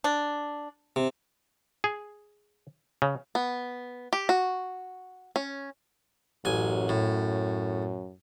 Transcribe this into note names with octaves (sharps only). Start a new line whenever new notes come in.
D4
C3
G#4
C#3
B3
G4
F#4
C#4
A1 F#2 G#5
A2